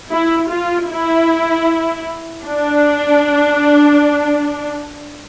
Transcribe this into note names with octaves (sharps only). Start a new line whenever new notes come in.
E4
F4
E4
D4